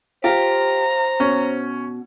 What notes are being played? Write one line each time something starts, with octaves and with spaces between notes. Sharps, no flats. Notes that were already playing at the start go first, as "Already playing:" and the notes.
F4 G4 C5 A#5
B2 C#4